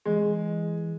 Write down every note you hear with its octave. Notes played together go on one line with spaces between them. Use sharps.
E3 G#3